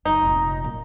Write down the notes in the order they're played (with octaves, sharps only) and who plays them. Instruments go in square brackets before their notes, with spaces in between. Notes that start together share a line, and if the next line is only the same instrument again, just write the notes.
[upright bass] F#1 F#3 [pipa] D#4
[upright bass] F1 A#2
A#2 F#3